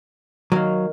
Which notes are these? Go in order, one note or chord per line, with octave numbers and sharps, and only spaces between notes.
D#3 F#3 A#3